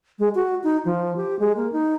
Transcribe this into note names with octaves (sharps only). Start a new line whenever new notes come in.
G#3
F#4
D#4
F3
G4
G#3
A#3
D#4